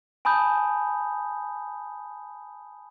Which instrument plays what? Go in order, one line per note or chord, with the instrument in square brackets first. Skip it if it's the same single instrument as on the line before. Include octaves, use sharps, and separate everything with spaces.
[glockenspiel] G#5 A5 B5 D#6 G6